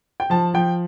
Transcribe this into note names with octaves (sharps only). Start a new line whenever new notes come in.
G5
F3 A5
F3 G5